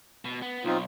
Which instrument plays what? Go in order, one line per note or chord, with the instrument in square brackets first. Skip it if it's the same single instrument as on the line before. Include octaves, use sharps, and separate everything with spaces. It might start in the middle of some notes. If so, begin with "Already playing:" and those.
[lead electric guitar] B2
B3
[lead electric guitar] B1 [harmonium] C4 D#4 F4